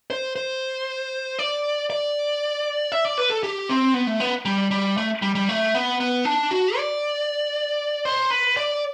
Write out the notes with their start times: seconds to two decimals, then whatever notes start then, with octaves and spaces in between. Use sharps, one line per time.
0.10 C5
0.36 C5
1.39 D5
1.90 D5
2.92 E5
3.05 D5
3.18 B4
3.30 A4
3.43 G4
3.69 C4
3.94 B3
4.07 A3
4.20 B3
4.45 G3
4.71 G3
4.97 A3
5.22 G3
5.35 G3
5.49 A3
5.75 B3
6.00 B3
6.25 D4
6.51 F#4
6.77 D5
8.05 C5
8.31 B4
8.57 D5